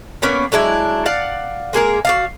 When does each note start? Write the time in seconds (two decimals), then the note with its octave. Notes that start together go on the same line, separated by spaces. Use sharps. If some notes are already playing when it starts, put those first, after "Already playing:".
0.22 A#3 B3 C#4 D5
0.52 F#3 G#3 D4 E4
1.06 D5 F5 F#5
1.73 G#3 A#3 G#4 A#4
2.05 F#4 D5 F5